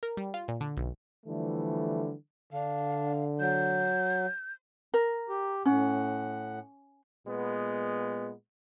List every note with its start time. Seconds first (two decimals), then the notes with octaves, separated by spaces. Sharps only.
0.03 A#4
0.17 G3
0.34 F4
0.48 A#2
0.61 D3
0.77 B1
1.26 D3 E3 F3 G3 A3
2.53 D3 D4 F5
3.40 F#3 G6
4.94 A#4
5.29 G4
5.65 A2 C#4 F#5
7.26 A#2 G#3 B3